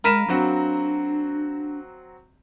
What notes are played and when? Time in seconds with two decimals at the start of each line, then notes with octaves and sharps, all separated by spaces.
0.04 G#3 A#4 F5 B5 F6 D#7 E7
0.28 F#3 C4 D4 F#4